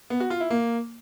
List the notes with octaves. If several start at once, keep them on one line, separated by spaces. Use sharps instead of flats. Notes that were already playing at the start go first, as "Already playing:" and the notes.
B3
F#4
F4
E4
A#3